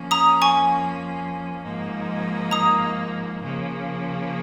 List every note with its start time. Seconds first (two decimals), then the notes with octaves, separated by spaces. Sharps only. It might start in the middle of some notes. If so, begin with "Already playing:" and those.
Already playing: F2 F3 A#3 C#4
0.11 A#5 D#6
0.42 G#5 C#6
1.62 G#2 F3 A#3 D#4
2.51 A#5 D#6
3.42 C#3 F3 A#3